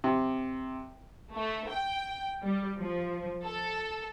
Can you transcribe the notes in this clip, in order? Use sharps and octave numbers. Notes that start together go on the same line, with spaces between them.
C3
A3
G5
G3
F3
A4